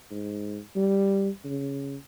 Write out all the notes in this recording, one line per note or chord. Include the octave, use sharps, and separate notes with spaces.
G#2
G3
C#3